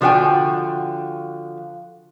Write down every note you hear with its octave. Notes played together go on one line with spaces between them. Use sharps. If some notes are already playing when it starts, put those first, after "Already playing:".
D3 F3 F#4 B4 G5 G#5